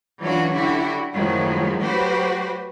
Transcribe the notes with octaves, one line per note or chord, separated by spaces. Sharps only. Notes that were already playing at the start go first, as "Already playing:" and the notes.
E3 F#3 C#4 D4 F4 F#4
D3 E4 F#4 G4
F#2 A2 D#3 F3 F#3 G#3
F#3 A3 F#4 G4 B4 C5